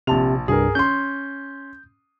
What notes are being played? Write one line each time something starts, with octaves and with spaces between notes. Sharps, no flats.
A#1 C3 A5 F7
C2 G2 G#4 A#4
C#4 C6 G6